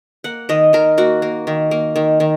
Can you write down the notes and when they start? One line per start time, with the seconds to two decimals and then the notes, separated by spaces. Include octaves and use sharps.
0.24 A#3 F#5
0.49 D#3 D#5
0.73 D#3 A#4
0.98 A#3 F#4
1.22 A#3
1.47 D#3
1.71 A#3
1.96 D#3
2.20 D#3